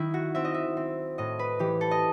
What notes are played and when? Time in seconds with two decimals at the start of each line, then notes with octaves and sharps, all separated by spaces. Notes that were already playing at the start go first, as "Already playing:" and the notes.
Already playing: D#3 E4
0.14 F#4
0.35 C4 E5
0.44 D#5
0.54 E5
0.77 C4
1.18 A2 D#5
1.39 B4
1.59 E3 G4
1.81 A4
1.91 D#5